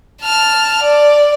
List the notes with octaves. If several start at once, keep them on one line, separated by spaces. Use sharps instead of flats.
A5 F6
D5